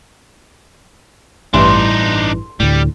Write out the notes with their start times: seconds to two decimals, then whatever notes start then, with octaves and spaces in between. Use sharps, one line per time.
1.54 A1 G2 E3 D4 D#4 C6
2.60 D2 A2 G3